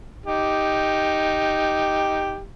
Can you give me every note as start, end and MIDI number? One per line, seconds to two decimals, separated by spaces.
0.26 2.41 63
0.26 2.41 67